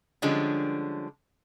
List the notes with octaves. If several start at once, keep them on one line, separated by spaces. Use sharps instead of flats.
D3 F3 G3 G#3 C#4 D4